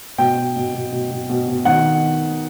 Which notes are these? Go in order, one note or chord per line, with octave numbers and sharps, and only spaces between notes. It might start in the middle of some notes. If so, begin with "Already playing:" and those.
B2 G5
B2
B2
B2
B2
B2
B2
B2
D#3 F#5